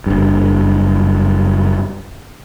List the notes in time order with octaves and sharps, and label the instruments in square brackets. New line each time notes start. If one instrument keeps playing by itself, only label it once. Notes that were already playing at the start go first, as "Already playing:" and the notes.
[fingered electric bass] F#1 G2